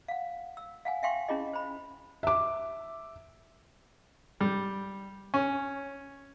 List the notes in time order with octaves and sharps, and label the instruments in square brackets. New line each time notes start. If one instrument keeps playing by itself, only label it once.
[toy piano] F5 F#5
E6
F5 F#5 G#5
E5 F5 G5 G#5 C6 C#6
C#4 E4 F4 G#4 D#5
C5 B5
[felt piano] E5 D6
[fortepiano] G3
C#4